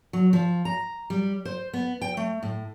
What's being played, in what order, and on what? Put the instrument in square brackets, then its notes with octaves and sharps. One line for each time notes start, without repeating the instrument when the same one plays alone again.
[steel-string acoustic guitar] F#3
F3
A#5
G3
C5
B3
G5
A3
A2